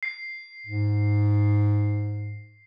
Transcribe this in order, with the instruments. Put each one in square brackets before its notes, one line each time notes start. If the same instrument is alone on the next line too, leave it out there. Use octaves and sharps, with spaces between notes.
[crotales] C7
[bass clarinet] G#2